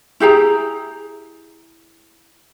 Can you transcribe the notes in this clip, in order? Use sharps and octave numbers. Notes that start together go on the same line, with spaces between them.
E4 G4 G#4 A#5